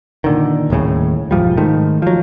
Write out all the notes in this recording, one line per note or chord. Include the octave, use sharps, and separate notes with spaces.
A#2 D3 D#3
D#1 D#2 A2 C#3
E1 G#2 F3 G3
G#2 D#3 A3
F3 F#3